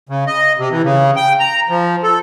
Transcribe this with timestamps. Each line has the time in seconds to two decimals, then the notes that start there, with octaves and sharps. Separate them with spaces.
0.09 C#3
0.27 D#5
0.58 C3
0.71 E3
0.83 C#3
1.16 G5
1.40 A#5
1.69 F3
2.03 A4